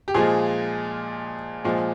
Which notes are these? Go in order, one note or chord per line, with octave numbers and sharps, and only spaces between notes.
G4
A#2 F3 G#3 G#4
A#2 F3 G#3